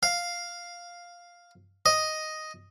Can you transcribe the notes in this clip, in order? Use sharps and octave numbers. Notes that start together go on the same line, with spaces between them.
F5
D#5